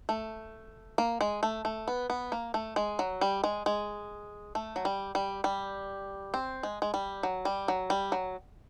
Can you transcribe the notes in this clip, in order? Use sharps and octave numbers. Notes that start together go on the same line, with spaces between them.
A3
A#3
G#3
A3
A3
B3
B3
A#3
A3
G#3
F#3
G3
G#3
G#3
A3
F#3
G3
G3
G3
C4
G#3
G#3
G3
F#3
G3
F#3
G3
F#3